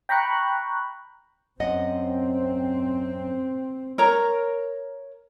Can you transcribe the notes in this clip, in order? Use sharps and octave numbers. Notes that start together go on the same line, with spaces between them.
G5 A#5 B5 C#6 F#6
F#2 C4 D#5 F#5
A#4 C#5 A#5